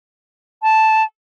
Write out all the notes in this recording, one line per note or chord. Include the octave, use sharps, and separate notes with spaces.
A5